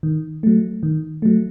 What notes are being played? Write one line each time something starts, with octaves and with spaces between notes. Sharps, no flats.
D#3
F#3 A3
D#3
F#3 A3